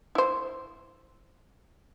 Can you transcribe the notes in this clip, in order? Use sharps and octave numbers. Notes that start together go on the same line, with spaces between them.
E4 C5